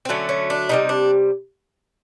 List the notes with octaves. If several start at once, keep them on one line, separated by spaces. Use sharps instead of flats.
C4
D3 F#3 A3 C#4
C#4
D4
C3 E3 G3 D#4
D4